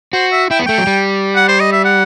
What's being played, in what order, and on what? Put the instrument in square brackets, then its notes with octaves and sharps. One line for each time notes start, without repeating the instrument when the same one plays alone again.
[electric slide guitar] F#4 [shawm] C5
[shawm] E5
[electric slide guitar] E4 [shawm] G5
[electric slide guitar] B3
[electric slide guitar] A3 [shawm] G5
[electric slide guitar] F#3
G3
[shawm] F#5
C5
D#5
E5
F#5